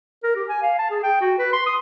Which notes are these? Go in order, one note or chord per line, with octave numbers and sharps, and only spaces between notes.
A#4
G4
G#5
F5
A5
G#4
G5
F#4
B4
C6
D#6